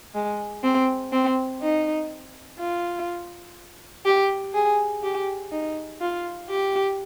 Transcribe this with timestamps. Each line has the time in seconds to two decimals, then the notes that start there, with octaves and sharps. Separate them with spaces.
0.14 G#3
0.64 C4
1.13 C4
1.62 D#4
2.60 F4
4.05 G4
4.54 G#4
5.03 G4
5.52 D#4
6.01 F4
6.50 G4